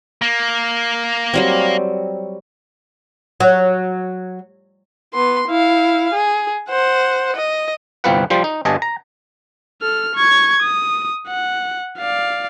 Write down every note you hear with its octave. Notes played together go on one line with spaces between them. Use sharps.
A#3
F#3 G3 C4
F#3
B3 C6
E4 F5
G#4
C5 F#5
D#5
G1 C2 C4 F4 B4 F#5
F3 G3 C5
D#4
G1 G2 D#5 G#5 A5
A#5
A4 F6
C#6 G#6
D#6
F#5
D5 F5